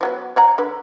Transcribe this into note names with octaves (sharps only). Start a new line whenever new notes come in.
F3 F#3 B3
C#5 F#5 A#5
D3 B4